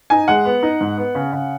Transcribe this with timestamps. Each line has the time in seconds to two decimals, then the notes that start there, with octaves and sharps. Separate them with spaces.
0.10 D#4 G#5
0.28 G#3 F#5
0.45 B3
0.63 D#4
0.81 G#2
0.98 B3
1.15 C#3
1.33 C#3